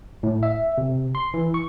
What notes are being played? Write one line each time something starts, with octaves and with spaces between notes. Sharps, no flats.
A2
E5
C3
C6
E3
C#6